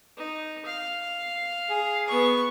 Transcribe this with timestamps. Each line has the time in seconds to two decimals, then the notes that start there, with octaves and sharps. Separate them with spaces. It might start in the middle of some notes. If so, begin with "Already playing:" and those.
0.17 D#4
0.65 F5
1.70 G#4
2.08 B3 C#6